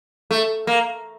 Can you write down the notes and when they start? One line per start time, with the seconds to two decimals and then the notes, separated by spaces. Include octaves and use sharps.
0.31 A3
0.67 A#3